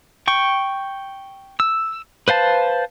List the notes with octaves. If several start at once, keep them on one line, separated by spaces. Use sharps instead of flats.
G5 C#6
E6
B4 C5 F5 A5